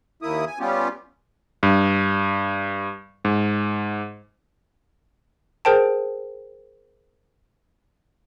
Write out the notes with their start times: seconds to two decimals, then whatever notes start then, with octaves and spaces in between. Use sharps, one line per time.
0.22 D#2 A#3 E4 D#6
0.47 G#5
0.60 G3 B3 C#4 F4 G4
1.63 G2
3.25 G#2
5.65 G#4 A#4 C5 G5 A5